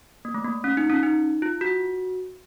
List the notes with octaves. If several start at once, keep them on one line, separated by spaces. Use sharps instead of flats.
A#3
A3
A#3
C#4
D#4
C#4
D#4
F4
F#4